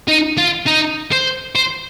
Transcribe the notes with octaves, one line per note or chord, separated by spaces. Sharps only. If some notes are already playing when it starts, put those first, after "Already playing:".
D#4
F4
D#4
C5
C5